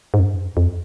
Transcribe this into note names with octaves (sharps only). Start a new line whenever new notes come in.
G#2
F#2
G2
F#2
F2